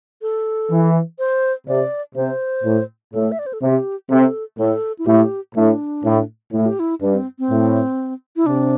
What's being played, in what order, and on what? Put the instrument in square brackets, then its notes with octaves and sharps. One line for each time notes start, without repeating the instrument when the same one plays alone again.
[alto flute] A4
[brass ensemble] E3
[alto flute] C5
[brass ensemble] C3 [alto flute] D5
[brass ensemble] C3 [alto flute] C5
[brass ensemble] A2
[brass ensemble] A2 [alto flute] A4
[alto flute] E5
D5
C5
A4
[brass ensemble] C3 [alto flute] G4
[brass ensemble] C3 [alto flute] A4
[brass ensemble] A2 [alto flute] A4
[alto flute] E4
[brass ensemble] A2 [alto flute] G4
[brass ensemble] A2 [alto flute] D4
[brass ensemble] A2
[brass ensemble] A2 [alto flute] E4
[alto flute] G4
E4
[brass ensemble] G2 [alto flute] D4
[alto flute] C4
C4
[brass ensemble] A2
[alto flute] E4
[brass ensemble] C3 [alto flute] D4